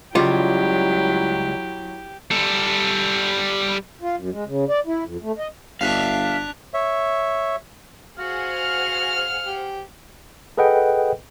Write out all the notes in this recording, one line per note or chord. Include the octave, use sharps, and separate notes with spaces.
C#2 F#3 G3 E4 F4 G4
G3 A4
F4
F#2
G#3
C#3
D5
E4
F2
A3
D#5
G1 D4 E5 F5 F#6 B6 F7
C#5 E5
F#4 G#4 C5 F5 F#5
F6
G4
G#4 A4 B4 D#5 F#5 G5